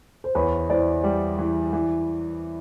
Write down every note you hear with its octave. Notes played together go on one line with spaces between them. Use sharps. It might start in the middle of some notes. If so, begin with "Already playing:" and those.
C5
E2 B4 C#5
E3 C5 D5
G3
E3
E3